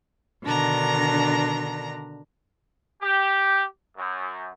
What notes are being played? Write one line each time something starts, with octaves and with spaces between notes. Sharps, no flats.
B2 D3 D#3 D4 A#5 A#6
G4
F#2